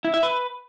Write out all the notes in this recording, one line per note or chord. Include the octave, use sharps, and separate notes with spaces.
E4
E5
B4